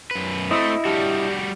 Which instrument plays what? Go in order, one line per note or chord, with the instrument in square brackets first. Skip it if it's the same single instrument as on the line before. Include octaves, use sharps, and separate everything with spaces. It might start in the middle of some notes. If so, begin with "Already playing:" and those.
[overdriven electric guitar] F#2 B4
[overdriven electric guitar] A3 [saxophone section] C4 [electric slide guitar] E4 D#5
[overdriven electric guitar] G3 F#4 [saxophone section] D4 G4